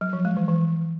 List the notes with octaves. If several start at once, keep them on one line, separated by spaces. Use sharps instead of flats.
F#3
F3
G#3
E3
E3